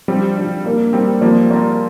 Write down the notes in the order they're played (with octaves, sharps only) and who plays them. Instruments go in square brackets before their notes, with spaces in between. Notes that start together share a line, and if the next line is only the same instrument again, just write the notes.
[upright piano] F3 D4 G4 [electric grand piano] G3 C4
[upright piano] F3 D4 G4
A#3 D4 A#4
[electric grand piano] G3 C4 [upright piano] A#3 D4 A#4
[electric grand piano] F3 A#3 [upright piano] G3 C4 A#4 D5
[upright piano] G3 C4 A#4 D5